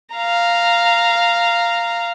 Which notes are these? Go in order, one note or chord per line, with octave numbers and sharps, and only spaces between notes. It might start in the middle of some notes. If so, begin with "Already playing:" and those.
F5 A#5